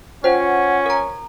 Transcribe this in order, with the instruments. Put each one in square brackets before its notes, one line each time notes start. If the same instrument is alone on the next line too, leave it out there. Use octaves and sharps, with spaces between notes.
[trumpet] C#4 [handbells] F4 G5 [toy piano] C5 [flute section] F#5
[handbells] A#4 A#5